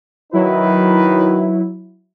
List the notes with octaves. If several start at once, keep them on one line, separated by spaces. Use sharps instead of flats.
D#3 F#3 D#4 E4 B4